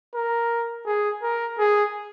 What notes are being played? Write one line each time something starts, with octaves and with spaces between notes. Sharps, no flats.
A#4
G#4
A#4
G#4